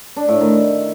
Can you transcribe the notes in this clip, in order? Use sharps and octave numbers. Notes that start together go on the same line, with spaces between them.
D4
A2
D#3